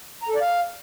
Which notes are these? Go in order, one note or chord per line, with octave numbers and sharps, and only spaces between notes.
A#5
A4
D5
F5